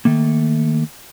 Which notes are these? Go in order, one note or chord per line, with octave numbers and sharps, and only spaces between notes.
D#3 A3 A#3